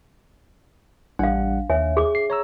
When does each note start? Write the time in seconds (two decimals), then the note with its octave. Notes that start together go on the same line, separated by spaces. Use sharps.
1.19 A1 G3 D4 F5 F#5
1.70 D#2 C#5 E5 G#5
1.97 G#4 D6
2.15 C7
2.30 C#5 A#5 E6